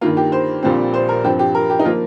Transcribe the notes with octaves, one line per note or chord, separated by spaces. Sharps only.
G2 D#3 A#3 F4
G4
C5
A#1 A#2 G3 C4
C5
A#4
G2 F3 C4 G4
G4
A#4
G4
D#4
F3 A#3 F4